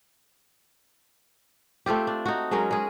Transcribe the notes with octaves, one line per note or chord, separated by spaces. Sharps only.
A3 C4 F4 G4
D4
D#4 F#4
F#3 G#3 C#4 A#4
G#3 G#4